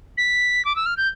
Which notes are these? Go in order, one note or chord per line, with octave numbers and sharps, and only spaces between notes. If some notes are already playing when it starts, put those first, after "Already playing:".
B6
D6
E6
F6
G6